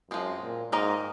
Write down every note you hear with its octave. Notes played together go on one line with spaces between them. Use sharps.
F#2 F3 G#3 C4
A#2
G#2 D#3 A#3 D#4 A#4 D#5